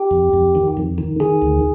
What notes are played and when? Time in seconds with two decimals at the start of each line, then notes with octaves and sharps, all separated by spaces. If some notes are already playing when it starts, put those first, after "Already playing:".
Already playing: G4
0.11 F2
0.33 F2
0.55 D#3
0.77 F2
0.98 D#3
1.20 D#3 G#4
1.42 D2